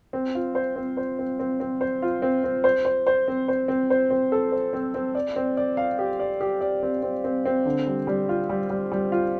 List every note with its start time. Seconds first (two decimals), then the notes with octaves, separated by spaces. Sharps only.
0.13 C4
0.35 F4
0.55 C5
0.76 C4
0.97 C5
1.19 C4
1.39 C4
1.60 C4
1.81 C5
2.02 F4
2.22 C4
2.44 C4
2.64 C5
2.85 C5
3.07 C5
3.28 C4
3.48 C5
3.68 C4
3.90 C5
4.10 C4
4.32 A4
4.52 C5
4.73 C4
4.94 C4
5.15 D5
5.36 C4
5.57 D5
5.77 F5
5.99 G4
6.19 D5
6.41 G4
6.61 D5
6.83 C4
7.03 C4
7.24 C4
7.45 C4
7.65 D3
7.87 G3
8.07 G3
8.29 F4
8.49 G3
8.70 G3
8.92 G3
9.12 F4